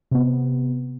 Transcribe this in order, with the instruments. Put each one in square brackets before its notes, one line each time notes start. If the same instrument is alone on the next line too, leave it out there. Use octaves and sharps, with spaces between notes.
[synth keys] C3 B3